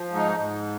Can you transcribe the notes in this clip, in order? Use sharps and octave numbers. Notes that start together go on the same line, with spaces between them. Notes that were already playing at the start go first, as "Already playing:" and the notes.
Already playing: F3
G#2
D#4
G#2